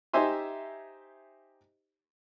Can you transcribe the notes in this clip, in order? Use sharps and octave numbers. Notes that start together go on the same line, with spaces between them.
D#4 G4 C5 E5 G#5 C6